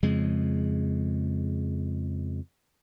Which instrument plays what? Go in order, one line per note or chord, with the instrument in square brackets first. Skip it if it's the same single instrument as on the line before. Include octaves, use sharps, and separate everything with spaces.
[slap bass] F2 C#3 G#3